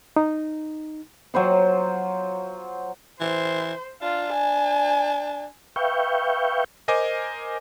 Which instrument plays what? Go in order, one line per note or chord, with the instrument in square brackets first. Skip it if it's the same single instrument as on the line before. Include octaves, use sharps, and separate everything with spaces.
[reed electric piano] D#4
[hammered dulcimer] F#3 F4 C5 F#5
[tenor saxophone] E3 [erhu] C5
[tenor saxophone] D4 [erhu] F4
[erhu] G#5
[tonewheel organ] B4 E5 F5 G5 C#6 G6
[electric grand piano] A#4 C5 D#5 G#5 D6